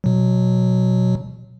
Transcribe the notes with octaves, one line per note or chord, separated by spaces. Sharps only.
B2 F#3